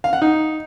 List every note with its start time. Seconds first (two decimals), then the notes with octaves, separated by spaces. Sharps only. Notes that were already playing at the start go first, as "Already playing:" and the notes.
0.04 F5
0.13 F#5
0.22 D#4